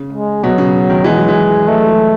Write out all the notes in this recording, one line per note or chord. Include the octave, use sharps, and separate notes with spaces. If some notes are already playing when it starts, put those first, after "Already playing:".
Already playing: C#3
G#3
B2 F#3
C#3
D#3
E3 G#3
F#3
E3
F#3 A3
G#3